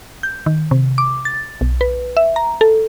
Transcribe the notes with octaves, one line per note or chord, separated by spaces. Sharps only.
G6
D#3
C3
D6
A6
B1
B4
E5
A#5
A4